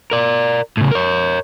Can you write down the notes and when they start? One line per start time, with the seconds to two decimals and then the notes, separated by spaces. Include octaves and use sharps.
0.11 A#4 D5
0.77 A2 C#3
0.92 A#4 C#5